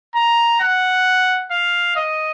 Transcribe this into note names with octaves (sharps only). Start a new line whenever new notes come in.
A#5
F#5
F5
D#5